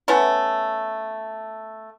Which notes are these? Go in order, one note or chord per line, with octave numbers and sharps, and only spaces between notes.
A3 B3 C#4 E4